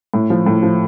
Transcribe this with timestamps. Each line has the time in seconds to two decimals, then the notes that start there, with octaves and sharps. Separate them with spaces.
0.14 A2
0.30 F3
0.46 A2
0.63 F3